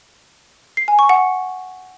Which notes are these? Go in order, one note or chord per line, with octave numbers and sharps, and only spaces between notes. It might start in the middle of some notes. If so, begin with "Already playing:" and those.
C7
G#5
C#6
F#5